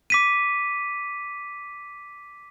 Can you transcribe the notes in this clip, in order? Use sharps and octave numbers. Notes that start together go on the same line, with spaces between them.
D6 B6 D#7